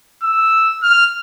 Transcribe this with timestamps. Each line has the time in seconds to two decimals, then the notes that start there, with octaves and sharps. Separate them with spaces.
0.23 E6
0.83 F6